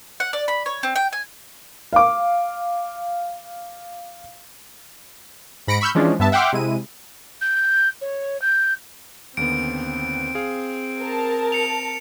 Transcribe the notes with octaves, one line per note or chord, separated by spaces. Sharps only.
F#5
D5
B5
C#5
C4
G5
G#5
F5 D6
G#2 B5 A#6 C#7 D7
B5 C#6 E6 F6 G6
E3 F3 G#3 C#4 D4
G2 B3 E5 A5
E5 F#5 G5 C6 D6 F6
C3 G#3 E4 D#7
G6
C#5
G6
D#2 D3 B3 C4 D7
G#4 F5
A#4 A5
C#7 F7